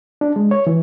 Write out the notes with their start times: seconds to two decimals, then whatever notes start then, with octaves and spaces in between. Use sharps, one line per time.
0.21 D4
0.36 G#3
0.51 C#5
0.67 E3